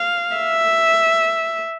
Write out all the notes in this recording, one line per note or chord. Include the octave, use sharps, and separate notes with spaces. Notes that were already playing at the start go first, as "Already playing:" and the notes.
Already playing: F5
E5